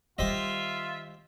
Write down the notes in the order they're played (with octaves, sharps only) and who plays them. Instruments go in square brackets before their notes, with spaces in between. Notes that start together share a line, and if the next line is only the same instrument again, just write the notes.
[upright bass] D#3 G3 [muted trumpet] F4 [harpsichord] G4 C5 D#5 [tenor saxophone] E5